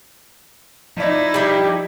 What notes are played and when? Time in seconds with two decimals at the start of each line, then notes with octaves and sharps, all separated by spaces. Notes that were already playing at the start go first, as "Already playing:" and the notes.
0.97 F3 D#4 E4 D5
1.34 G3 D4